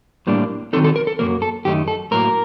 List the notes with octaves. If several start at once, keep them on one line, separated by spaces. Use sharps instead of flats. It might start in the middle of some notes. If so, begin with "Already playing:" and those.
A2 G3 A#3 D4
D#3 F#3 C4 D#4 A4
A4
A#4
A4
F#2 D#3 F#3 A#3 A#4
A4
F#2 D#3 A3 D#4 G4
A4
A2 F#3 A#3 A#4